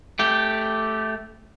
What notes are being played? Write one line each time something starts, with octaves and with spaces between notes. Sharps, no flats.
A3 G4